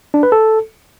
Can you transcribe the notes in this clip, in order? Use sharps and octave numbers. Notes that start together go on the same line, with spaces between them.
D4
B4
A4